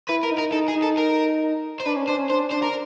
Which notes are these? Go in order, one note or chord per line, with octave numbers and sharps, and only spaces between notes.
E4 B4
A#4
D#4
A#4
D#4 A4
G#4
D#4
A4
A#4
C5
D4 B4
C#4
D4 C5
C#4
D4 C5
D4 C5
A#4